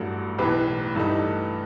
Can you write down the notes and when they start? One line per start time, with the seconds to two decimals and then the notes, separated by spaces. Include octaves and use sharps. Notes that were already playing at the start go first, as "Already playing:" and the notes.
Already playing: A1 G2 F#3 A3 F#4 A4
0.38 B1 A2 E3 G4 B4
0.95 G2 E3 A3 D#4